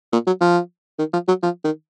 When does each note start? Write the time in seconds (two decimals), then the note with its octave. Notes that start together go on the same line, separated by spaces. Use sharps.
0.13 A#2
0.27 F#3
0.41 F3
0.99 D#3
1.13 F3
1.28 F#3
1.43 F3
1.64 D#3